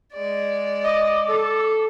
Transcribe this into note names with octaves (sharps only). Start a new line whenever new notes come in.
G#3 D5
D#5 D6
A4